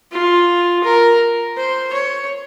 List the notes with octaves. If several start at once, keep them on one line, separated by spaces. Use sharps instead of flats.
F4
A#4
C5
C#5